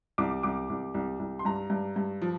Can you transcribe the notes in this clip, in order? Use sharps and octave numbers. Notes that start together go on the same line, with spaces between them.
C2 D6
C2 D6
C2
C2
C2
C6
G2 A#5
G2
G2
F3